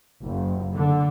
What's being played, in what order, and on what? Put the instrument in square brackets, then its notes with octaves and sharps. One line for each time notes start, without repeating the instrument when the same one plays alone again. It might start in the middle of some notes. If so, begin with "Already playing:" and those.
[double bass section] F#1
D3